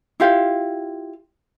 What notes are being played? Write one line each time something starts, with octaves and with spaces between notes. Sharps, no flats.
E4 F4 G4 F5